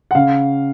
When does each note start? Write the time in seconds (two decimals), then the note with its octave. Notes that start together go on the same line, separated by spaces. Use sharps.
0.11 F#5
0.15 C#3 F5